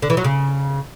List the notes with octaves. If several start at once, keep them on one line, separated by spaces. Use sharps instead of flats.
D3
E3
F#3
C#3